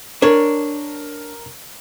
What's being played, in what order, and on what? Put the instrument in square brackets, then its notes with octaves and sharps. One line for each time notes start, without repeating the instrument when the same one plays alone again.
[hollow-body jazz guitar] D4 C#5 [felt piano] A#4